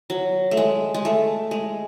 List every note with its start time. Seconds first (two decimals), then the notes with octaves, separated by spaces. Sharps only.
0.10 F#3
0.51 A3
0.57 G#3
0.94 G#3
1.05 A3
1.51 G#3